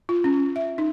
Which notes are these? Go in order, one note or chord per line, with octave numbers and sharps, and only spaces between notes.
F4
C#4
E5
D#4